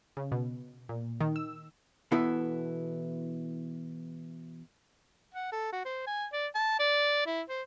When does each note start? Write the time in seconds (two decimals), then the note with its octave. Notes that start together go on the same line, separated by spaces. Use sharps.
0.17 C#3
0.32 B2
0.89 A#2
1.21 D#3
1.36 E6
2.12 B2 E3 B3 E4 A4
5.34 F#5
5.52 A4
5.72 F#4
5.85 C5
6.07 G#5
6.33 D5
6.55 A5
6.80 D5
7.26 E4
7.49 C5